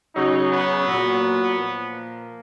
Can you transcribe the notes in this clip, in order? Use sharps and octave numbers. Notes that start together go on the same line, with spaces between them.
C#3 F#3 D#4
B3
A#2 F#3
A#2 F3
A#3